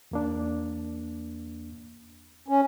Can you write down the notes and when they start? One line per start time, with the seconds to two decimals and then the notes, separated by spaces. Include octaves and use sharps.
0.11 E2 A#3 D4
2.48 C#4